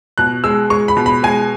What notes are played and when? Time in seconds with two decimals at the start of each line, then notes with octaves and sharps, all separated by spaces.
0.18 B2 F#6
0.44 G#3 E6
0.70 G#3 C#6
0.88 B5
0.97 B2
1.06 B5
1.23 G#3 G#5